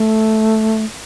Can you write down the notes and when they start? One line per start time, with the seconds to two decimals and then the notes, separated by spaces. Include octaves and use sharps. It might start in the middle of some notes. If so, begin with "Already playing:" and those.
Already playing: A3